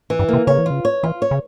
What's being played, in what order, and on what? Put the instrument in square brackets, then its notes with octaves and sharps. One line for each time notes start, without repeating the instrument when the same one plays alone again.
[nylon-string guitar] E3
[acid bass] G2
[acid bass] C3 [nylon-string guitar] A#3
[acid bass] C#3 [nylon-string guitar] C#5
[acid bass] E3
[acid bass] C#3 [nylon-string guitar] F4
[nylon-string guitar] C#5
[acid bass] E3 [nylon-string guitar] F4
[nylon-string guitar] C#5
[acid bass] C#3